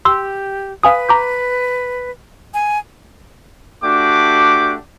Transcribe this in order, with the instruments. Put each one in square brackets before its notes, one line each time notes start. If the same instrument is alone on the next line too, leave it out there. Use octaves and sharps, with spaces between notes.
[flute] G4 [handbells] C6 E6
[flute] B4 [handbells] F5 G#5 D#6
[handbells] A#5 D6 G6
[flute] G#5
[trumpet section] A3 D4 F#4 G4 D6